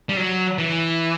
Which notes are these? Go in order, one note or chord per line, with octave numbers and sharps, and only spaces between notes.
G3
F#3
E3